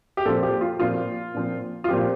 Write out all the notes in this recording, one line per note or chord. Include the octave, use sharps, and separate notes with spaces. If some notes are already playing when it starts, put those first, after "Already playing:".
G4
A#2 F3 C4 A4
G4
F4
A#2 F3 C4 F4
A#2 F3 C4
F4
A#2 F3 C4 G4